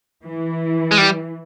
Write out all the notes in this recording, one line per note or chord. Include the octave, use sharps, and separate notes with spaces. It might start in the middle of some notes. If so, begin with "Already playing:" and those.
E3
G#3
G3